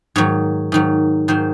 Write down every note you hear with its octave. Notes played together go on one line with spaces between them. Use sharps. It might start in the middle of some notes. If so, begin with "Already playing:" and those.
G#2 D#3 F#3 C#5
G#2 D#3 F#3
G#2 D#3 F#3 C5